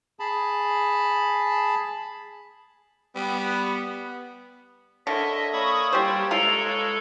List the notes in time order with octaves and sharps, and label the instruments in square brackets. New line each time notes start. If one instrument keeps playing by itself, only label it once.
[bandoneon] G#4 A5 B5
[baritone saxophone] G3 [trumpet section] B3
[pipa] D3 [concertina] A#4 C#5 [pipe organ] D#5 E5
[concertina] A#3 C#5 E6 [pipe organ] B5 C#6 D#6
[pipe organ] G3 [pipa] G4 C5
[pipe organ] G#3 A4 [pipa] F4 A#4
[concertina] B4 C#5 A5